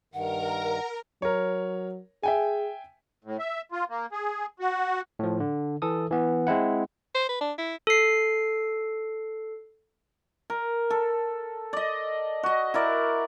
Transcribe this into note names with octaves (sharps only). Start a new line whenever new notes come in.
G2 D#3 A#4 F#5 A#5
F#3 A#4 C#5
G#4 E5 G5 G#5
A2
E5
F4
A#3
G#4
F#4
A2 F3
D3
E3 A4 D#6
E3 B3
G#3 C4 E4 F#5
C5
B4
D4
E4
A4 C7
A#4
A4
D5 D#5
F#4 D#5
E4 A#4 D5